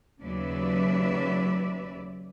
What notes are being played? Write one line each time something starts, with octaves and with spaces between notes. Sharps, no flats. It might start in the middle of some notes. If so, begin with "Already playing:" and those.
D#2 C#3 F#3 B4 D5 E5